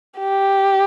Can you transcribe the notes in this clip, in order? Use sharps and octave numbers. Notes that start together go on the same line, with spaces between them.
G4